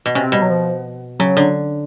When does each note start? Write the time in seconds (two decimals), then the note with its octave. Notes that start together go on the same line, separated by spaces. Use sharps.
0.06 B2
0.15 C3 C#4
0.24 C4
0.32 B2 G3
0.42 F#3
0.50 F3
1.20 C#3 F#3
1.37 D3